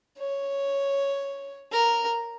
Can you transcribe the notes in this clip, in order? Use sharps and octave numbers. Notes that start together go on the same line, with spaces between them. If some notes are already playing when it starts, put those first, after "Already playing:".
C#5
A#4